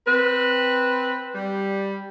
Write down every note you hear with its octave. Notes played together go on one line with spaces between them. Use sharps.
C4 B4
G3